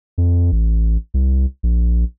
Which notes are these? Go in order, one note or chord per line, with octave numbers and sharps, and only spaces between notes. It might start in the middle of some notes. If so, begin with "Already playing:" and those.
F2
A1
C2
A#1